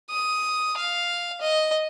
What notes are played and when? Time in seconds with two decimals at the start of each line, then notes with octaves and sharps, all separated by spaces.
0.10 D#6
0.77 F5
1.41 D#5